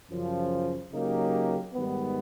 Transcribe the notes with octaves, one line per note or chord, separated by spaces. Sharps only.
F#2 C#3 F3
C#3 F#3 A#3 D#4 G4
G#2 D#3 G3 B3